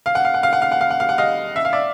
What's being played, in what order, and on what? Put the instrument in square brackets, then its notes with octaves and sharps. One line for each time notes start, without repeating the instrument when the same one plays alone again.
[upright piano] F5
F#5
F5
F#5
F5
F#5
F5
F#5
F5
F#5
F5
F#5
D#5 F5
E5
F5
D5 E5